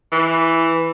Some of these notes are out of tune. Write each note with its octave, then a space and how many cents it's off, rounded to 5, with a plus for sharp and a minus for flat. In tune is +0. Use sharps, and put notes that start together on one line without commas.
E3 +0